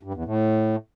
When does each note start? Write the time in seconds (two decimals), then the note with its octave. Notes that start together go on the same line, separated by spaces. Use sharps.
0.03 G2
0.14 E2
0.25 A2